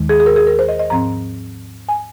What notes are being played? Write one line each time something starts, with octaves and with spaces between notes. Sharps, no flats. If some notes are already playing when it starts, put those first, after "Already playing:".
Already playing: D#2 D#3 G#3
G#4
G#4
A#4
G#4
A#4
C5
D#5
D#5
G#2 F3 C4 A#5
G#5